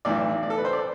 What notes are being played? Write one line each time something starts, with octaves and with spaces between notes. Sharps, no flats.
B1 A2 E3 D5
D5
A4
B4
C5
D5